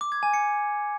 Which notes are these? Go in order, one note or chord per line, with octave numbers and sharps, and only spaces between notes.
D6
G#6
G#5
C#7